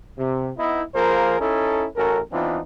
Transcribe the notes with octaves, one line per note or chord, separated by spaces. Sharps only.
C3
B3 D#4 E4
F3 A#3 F4 G#4 A#4 C5
C#4 D#4 E4 A4
A1 C#4 F#4 A4 A#4
E3 B3 C4 D4 D#4 F4